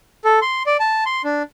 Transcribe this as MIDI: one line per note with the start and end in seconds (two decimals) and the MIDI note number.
0.24 0.40 69
0.42 0.63 84
0.66 0.77 74
0.80 1.04 81
1.06 1.22 84
1.24 1.43 62